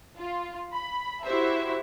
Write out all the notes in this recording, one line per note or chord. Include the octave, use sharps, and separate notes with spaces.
F4
B5
E4 F#4 G4 C5 E5